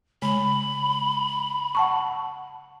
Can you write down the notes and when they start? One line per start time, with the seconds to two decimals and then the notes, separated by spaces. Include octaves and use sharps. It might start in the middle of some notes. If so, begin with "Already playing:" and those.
0.22 C#3 G#3 B5
1.75 F#5 A5 C#6